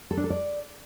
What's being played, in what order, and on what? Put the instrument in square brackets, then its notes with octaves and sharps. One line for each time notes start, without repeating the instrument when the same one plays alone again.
[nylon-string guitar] A4
D4
A4
D5